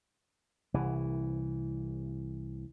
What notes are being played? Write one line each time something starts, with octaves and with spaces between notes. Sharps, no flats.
C2 E3